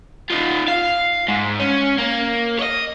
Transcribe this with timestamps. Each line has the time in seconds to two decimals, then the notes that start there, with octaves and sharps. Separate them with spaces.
0.30 D#4 F4
0.68 F5
1.28 G#2
1.59 C#4
1.98 A#3
2.59 C#5 D#5